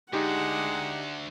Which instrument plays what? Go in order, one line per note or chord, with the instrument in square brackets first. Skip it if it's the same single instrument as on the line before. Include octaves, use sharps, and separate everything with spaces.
[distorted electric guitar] D2 [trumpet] G#3 [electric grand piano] D#4 G4 [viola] F#5